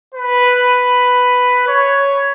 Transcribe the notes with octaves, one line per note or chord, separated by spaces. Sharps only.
B4
C#5